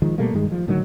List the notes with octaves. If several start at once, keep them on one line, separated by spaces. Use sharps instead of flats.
D#3 F3 G#3
B2 G3 A3 A#3
G2 D#3 G#3
F3
A2 D3 D#3 F#3